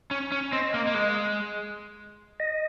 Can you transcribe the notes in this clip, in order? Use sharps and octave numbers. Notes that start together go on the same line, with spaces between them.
C#4
C#4
C4 D#5
A#3
A#3
G#3
D#5